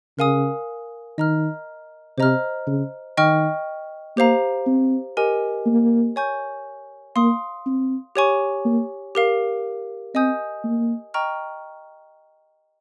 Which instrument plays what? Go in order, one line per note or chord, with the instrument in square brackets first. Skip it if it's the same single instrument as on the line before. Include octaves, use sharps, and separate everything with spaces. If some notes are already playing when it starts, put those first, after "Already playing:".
[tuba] C#3 [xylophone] A#4 F5 G#5 D#6
[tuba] D#3 [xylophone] D#5 A#5 F6
[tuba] C3 [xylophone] C5 D#5 A#5 F6
[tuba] C#3
[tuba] D#3 [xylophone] D#5 G5 C#6 F6
[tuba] A#3 [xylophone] G4 C5 F5 A#5
[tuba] C4
[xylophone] G4 A#4 D#5 G#5
[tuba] A#3
[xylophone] C#5 G#5 C#6 G6
[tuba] A#3 [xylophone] F5 C6 D#6
[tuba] C4
[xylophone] G4 C#5 G#5 C#6
[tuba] A#3
[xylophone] G4 A#4 F5
[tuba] C4 [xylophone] D#5 G#5 D#6 G6
[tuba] A#3
[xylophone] D#5 G5 A#5 C#6 F6